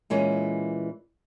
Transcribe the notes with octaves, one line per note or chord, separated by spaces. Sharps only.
A#2 E3 G#3 C#4